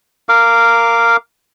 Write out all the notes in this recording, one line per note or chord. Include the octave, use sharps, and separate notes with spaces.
A#4 F5 D6